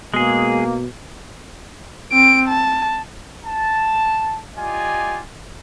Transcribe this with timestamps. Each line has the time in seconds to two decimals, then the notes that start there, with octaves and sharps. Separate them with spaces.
0.14 B2 G#3 A#3 G#4
2.13 C4 D7
2.49 A5
3.44 A5
4.56 F4 G4 D5 D#5 G#5